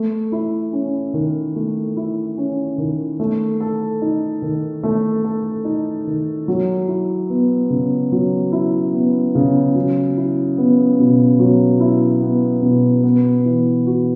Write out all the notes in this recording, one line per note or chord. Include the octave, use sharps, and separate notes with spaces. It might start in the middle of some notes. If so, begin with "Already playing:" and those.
Already playing: A3
E4
C#4
D#3
A3
E4
C#4
D#3
A3
A4
D#4
D#3
A3
A4
D#4
D#3
F#3
E4
B3
C#3
F#3
E4
B3
C#3
F#3
E4
B3
B2
F#3
E4
B3
B2
B3
E3
F#4